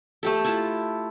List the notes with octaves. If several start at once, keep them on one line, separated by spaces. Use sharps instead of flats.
A3 G4 A4
E4 F4 A5